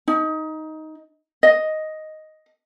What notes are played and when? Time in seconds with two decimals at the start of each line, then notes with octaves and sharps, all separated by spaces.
0.08 D#4
1.43 D#5